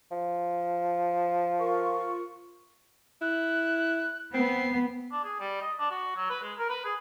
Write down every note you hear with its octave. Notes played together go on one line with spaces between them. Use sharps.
F3
F4 A#4 C#6
E4 F#6
B3 C4 C7
D4
G#4
G3
D#5
D4
F#4
F#3
B4
G#3
A#4
B4
G#4